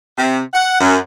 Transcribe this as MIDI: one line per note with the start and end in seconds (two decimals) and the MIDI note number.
0.18 0.41 48
0.54 0.80 78
0.81 0.97 42